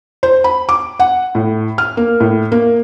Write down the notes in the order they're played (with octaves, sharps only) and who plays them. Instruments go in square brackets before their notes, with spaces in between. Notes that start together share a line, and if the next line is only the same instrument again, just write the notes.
[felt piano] C5
B5
D6
F#5
A2
F6
A#3
A2
A#3